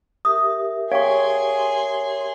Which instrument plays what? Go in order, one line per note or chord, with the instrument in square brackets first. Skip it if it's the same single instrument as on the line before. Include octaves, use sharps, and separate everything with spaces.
[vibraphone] G4 A#4 E5 [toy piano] D#6
[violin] G#4 C6 [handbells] C#5 [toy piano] F5 G5 C#6